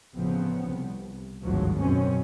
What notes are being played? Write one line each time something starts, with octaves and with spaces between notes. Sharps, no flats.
A1 C#3 F3 B3 C4
C2
G#1 D2 G2 F3 F#3
F#2 B2 D#3 C4 C#4